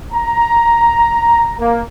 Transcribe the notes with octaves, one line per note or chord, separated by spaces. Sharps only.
A#5
A#3